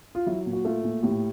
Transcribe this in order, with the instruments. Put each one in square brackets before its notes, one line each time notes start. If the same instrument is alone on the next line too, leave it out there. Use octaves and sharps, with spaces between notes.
[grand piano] F4
F#3 E4
A#2
F#4
A3 F4
A#2
A2 G4